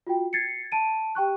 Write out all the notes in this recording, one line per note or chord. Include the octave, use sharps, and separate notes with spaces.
F4 F#4 G5
G#6 A6 C7 C#7
A5 D7 D#7
G4 G5 C#6 F#6